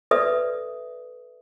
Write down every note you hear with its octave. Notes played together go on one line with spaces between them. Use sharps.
A4 B4 D5 E5 D#6